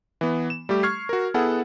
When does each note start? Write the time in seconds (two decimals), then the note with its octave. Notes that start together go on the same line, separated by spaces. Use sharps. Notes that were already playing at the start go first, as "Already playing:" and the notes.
0.21 E3 B3
0.50 E7
0.69 G3 A3 G4
0.83 C#6 F6 G#6 C7
1.09 F#4 A#4
1.34 B3 E4 G#4 A4 F#5